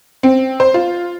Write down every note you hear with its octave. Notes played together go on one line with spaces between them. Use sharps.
C4
C5
F4